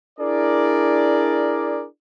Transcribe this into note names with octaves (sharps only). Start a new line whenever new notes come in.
D4 E4 G#4 A#4 D5